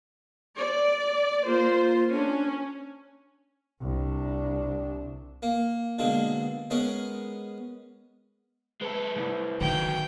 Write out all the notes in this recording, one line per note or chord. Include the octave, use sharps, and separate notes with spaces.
D5
A#3 F4 C5
C#4 D4
C2 D4
A#3
B2 D3 G#3 A#3
G#3 B3 C#4 A#4
G#3 A4 B4 E5
C2 A3 E4
D2 D#3 F#3 G5